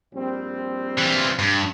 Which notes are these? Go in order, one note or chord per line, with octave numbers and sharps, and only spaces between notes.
A#1 G3 C4
E3 F4
G2